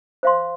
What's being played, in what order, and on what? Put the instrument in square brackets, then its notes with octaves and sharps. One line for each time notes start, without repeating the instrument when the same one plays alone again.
[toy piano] C5 F5 C6